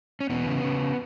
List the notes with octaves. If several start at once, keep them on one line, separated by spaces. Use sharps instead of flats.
C#4
E2 B2 B3
C#3
C#3